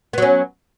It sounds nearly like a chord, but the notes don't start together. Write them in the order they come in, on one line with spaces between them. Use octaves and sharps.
B3 F#3 C#4